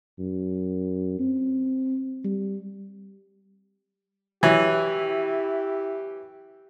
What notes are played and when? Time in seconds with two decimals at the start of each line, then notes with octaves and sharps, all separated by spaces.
0.19 F#2
1.19 C4
2.24 G3
4.43 E3 F#3 E4 G4